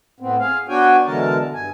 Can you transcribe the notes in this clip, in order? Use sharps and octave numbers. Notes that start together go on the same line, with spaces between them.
A2 B3 C4
G#4 F5
B3 D4 F#4 C#5 G5 G#5
B2 D3 E3 G#3 A#4 A5
G2 G#5